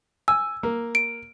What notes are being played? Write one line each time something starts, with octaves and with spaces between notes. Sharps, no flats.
G#5 E6
A#3
D7